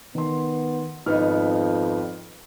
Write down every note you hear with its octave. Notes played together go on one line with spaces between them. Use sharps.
D#3 B3 C6
G#1 F2 B3 D#4 F6